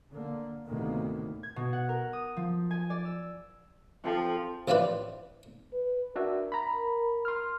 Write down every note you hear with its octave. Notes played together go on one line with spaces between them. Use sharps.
D3 A#3
D2 A2 C3 D#3 A#3 B3
G#6
B2
F#5
A#4
D#6
F3
G#5
D5
E6
F3 C4 G4 A4
A1 F3 E4 F4 B4 D5
B4
D4 F#4 A#4 E5
A#5 B5
C6 F6